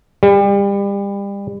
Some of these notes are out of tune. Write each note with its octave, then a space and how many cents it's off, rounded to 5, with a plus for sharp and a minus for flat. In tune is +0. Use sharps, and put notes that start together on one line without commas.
G3 +30